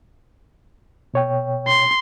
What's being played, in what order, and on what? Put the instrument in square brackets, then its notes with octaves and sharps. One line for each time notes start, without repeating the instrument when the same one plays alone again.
[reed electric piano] B2 C#5 G5
[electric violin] C6